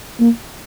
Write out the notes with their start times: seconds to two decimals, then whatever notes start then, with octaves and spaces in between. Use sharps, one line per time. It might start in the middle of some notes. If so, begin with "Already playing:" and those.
0.20 A#3